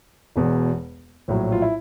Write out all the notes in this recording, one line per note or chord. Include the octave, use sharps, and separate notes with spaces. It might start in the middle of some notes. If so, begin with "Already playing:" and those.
E1 E2 B2
A#1 A2 F#3
F4
E4